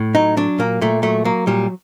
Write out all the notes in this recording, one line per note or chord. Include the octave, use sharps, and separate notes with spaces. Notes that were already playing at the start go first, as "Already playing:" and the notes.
Already playing: A2
F#3 D#4
F#3 D4
A#2 A#3
A#2 A3
F#3 A3
F#3 A#3
A#2 G3